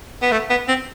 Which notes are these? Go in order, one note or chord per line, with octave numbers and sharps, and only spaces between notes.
B3
A3
B3
C4